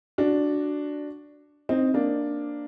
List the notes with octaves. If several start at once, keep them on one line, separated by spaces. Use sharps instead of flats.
D4 F#4
C4 D#4
A#3 D4